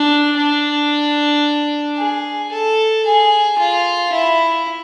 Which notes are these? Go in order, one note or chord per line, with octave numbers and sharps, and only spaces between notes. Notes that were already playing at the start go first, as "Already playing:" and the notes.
Already playing: D4
D4
G#4
A4
G#4
F4
E4